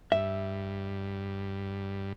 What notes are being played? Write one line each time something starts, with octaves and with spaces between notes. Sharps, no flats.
G2 E5